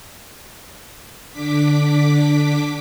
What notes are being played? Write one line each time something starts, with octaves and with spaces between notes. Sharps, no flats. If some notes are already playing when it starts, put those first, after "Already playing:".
D3 D4 D6 B6